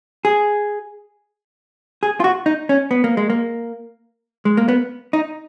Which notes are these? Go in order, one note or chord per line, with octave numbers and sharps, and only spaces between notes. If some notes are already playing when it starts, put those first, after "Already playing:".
G#4
G#4
F4
F#4
D#4
C#4
B3
A#3
G#3
A#3
G#3
A#3
B3
D#4